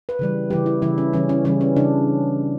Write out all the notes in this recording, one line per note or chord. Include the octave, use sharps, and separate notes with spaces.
B4
C#3 E3 G3
C#3 E3 G3 G4
E4
C#3 E3 G3 E4
C#4
C#3 E3 G3 C#4
C#4
C#3 E3 G3 C#4
C#4
C#3 E3 G3 D4